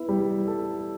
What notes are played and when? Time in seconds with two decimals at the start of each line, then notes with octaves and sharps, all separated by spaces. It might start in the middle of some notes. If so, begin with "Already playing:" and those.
Already playing: B3 E4
0.09 G3
0.47 A4